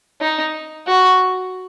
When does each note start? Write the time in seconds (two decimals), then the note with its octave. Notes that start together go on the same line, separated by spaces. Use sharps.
0.21 D#4
0.87 F#4